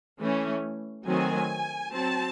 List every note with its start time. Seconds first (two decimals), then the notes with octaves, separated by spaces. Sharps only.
0.21 E3 A3 C#4
1.07 D#3 F#3 A3 C4 G#5
1.93 F#3 C4 A5